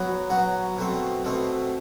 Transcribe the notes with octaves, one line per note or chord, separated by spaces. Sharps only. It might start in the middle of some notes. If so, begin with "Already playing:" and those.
Already playing: F#3 B3 F#4
F#3 B3 F#4
B2 A3 C4
B2 A3 C4